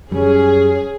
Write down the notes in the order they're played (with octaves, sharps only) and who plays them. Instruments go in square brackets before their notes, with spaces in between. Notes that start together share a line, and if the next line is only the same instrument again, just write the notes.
[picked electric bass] F#2 G3 [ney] C#4 [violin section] G#4